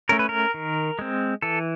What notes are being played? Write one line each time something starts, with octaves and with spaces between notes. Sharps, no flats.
A3 C#4 A#4
B4
A#4
D#3
G#3 C4
E3 A4